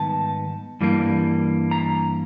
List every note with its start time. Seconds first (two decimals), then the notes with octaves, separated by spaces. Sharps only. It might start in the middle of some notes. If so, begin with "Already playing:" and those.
Already playing: G#2 D#3 G3 B3 D#4 A5
0.81 G2 E3 G3 A#3
1.71 A#5